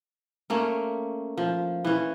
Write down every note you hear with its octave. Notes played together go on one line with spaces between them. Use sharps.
A3 A#3 C#4
F3
E3 C#4